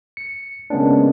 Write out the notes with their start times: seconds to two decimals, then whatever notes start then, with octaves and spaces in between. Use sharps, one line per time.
0.17 C#7
0.70 C#3 G#3 A#3 B3 C#4 D4